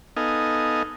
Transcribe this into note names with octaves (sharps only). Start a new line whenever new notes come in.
B3 D#4 A4 D#5 F5 G#5